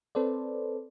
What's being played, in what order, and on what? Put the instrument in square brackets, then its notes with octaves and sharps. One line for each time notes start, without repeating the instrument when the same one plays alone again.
[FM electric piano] C4 A4 B4 C5 D5